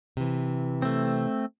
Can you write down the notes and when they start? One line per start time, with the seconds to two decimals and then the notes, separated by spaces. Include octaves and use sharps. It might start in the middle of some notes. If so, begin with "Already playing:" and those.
0.17 C3 E3
0.82 A3 C4